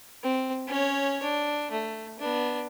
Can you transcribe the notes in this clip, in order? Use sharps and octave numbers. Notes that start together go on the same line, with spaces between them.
C4
C#4 C#5
D4
A3
B3 D4